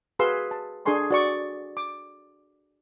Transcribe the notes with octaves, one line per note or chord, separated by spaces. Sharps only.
F#4 G#4 B4 F5 C6 E6
A5
D4 G#4 A4 G#5 C6 C#6
F#4 D5 C#6
D6